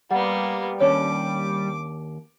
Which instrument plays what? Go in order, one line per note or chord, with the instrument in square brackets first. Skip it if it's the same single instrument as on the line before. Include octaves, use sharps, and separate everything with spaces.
[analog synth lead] G3 [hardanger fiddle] A#3 B3 [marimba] F#5
[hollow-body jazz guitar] D#2 C#4 D4 [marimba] C#5 [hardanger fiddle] D6